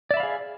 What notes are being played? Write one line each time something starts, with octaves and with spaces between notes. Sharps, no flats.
G#4 D5 E5 F5 B5